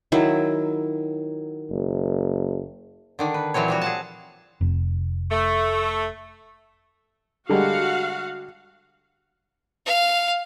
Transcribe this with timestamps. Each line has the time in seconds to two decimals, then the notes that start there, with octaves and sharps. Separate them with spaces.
0.12 D#3 F#3 E4
1.70 F#1
3.19 D3 D#3 D4
3.34 B4
3.54 A#2 E3 F#3 C4 C#5
3.68 F3 G3 F#4
3.81 G#4 F#5 A5
4.61 F1
5.31 A3
7.49 D3 G3 G#3 F#4 F5 F#5
9.86 F5